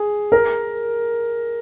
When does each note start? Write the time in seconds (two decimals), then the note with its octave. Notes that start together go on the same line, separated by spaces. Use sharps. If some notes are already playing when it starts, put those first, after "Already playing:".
Already playing: G#4
0.32 A#4